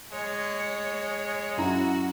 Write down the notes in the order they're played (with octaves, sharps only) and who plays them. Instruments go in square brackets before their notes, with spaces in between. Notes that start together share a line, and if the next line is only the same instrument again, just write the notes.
[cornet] G#3 [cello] C#5
[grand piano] F#2 E4 A#5 [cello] F#4